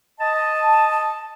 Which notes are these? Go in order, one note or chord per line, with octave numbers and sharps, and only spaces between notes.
D#5 A5